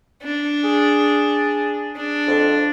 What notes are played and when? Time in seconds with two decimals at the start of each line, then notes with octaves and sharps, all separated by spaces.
0.23 D4
0.64 G#4
1.96 D4
2.27 F2